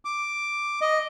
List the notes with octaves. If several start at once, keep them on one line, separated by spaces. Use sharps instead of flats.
D6
D#5